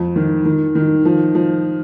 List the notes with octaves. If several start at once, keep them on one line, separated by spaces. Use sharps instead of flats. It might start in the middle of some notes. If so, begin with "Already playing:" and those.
Already playing: F2
D#3
D#3
D#3
F3
F3